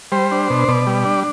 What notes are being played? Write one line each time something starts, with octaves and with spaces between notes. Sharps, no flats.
G3 C5
D4
B2
B2 D5
G3
D4